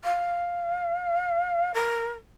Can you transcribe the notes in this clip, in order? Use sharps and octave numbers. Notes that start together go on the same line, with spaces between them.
F5
A#4